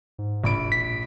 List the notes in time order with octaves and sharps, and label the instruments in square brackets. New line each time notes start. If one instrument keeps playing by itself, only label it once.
[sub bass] G#2
[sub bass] E1 [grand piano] A#1 B5 D7
[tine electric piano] B6